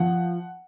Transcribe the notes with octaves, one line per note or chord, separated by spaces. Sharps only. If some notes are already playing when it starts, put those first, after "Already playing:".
Already playing: F3 F#5